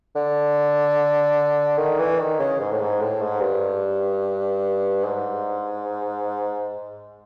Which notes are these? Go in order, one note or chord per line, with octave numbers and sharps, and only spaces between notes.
D3
D#3
E3
D#3
C#3
G#2
A2
G#2
A2
G#2
G2
G#2